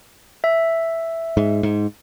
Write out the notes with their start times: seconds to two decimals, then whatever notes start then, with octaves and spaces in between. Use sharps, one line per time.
0.44 E5
1.37 G#2
1.63 G#2